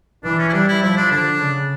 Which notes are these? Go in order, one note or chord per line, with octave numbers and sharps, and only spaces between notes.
E3 D4
C#4
E4
G3 D4
E4
F3 E4
D4
D3 D4
C#3